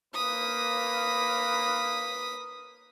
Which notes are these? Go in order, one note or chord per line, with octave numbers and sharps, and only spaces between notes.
A#3 B4 D#6 B6